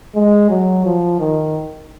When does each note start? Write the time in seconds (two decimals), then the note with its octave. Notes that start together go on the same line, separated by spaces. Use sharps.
0.16 G#3
0.50 F#3
0.85 F3
1.20 D#3